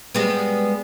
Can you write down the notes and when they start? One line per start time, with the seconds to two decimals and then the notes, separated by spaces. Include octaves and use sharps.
0.14 G3 G#3 B3